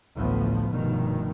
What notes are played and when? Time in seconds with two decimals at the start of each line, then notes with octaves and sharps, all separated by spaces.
0.17 A1 D2 A2 F3 B3
0.70 F1 G2 B2 D#3